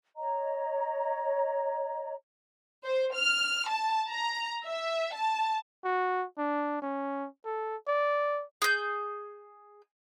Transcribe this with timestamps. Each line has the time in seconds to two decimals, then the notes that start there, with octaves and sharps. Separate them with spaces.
0.16 C#5 D#5 A#5
2.85 C5
3.15 F6
3.69 A5
4.10 A#5
4.65 E5
5.14 A5
5.85 F#4
6.38 D4
6.82 C#4
7.45 A4
7.87 D5
8.62 G#4 G6